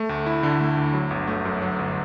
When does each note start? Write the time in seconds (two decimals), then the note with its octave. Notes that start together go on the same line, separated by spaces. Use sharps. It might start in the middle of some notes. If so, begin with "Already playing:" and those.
Already playing: A3
0.09 D2
0.26 E4
0.43 D3
0.60 A3
0.77 D2
0.93 F#3
1.11 G1
1.27 A3
1.45 F#2
1.62 F#3
1.79 G1